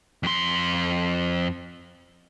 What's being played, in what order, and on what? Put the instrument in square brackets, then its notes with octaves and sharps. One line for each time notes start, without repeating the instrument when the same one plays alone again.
[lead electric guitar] F2 C6